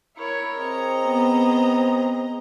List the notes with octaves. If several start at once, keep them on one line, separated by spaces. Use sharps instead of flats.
E4 A#4 C#5
C4 G#4 D#5 A#5
B3